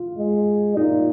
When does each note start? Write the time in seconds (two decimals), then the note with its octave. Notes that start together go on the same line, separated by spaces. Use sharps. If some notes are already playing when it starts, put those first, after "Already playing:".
Already playing: F4
0.18 G#3
0.77 A#2 D#4